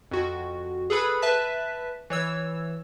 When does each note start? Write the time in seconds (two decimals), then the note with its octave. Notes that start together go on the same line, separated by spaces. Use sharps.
0.11 F2 F#4
0.90 G#4 A4 B4 B5
1.22 B4 E5 A5 B6
2.10 E3 C#5 E6